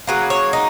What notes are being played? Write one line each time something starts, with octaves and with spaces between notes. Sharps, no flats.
C#3 F#3 A#3 B4
C#5
D#4